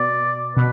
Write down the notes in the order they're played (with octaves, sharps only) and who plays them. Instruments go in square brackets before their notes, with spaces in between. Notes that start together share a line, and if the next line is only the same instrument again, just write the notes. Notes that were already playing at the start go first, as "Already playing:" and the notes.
Already playing: [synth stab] B2 [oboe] D5
[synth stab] B2 [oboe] B4